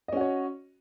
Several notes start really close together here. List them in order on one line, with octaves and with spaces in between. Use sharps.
D#5 C#4 F#4 C#5